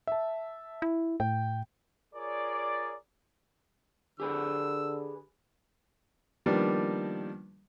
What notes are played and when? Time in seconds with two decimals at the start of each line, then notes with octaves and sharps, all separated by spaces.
0.07 E5 A5
0.82 E4
1.20 A2 G5
2.14 F4 G#4 A#4 C#5 D5
4.20 D3 G4 G#4 B4 E6
6.46 D#3 F3 G3 A#3 B3 D4